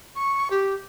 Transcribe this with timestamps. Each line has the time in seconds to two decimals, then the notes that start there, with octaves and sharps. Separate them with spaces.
0.15 C#6
0.50 G4